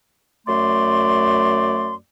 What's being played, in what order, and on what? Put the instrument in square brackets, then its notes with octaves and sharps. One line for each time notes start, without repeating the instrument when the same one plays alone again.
[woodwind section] F#2 A3 D5 C6